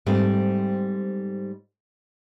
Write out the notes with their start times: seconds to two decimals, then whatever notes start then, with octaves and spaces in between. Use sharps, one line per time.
0.06 G#2 G3 A3 C4